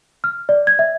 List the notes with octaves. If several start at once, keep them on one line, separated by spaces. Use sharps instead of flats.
F6
D5
G#6
E5